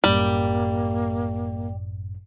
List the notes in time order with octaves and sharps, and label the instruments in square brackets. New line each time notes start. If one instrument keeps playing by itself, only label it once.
[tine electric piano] G1 F#2 A2 [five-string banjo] G3 [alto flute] A#3